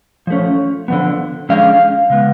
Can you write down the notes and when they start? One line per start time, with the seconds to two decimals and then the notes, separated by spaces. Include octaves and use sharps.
0.27 F3 A3 C#4
0.88 D3 F3 B3
1.49 D3 F3 G#3 C#4 F5
2.10 C#3 G#3 B3